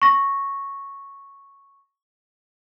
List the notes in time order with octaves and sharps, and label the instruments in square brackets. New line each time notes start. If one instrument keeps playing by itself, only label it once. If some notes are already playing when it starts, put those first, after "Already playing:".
[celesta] C#6 A#6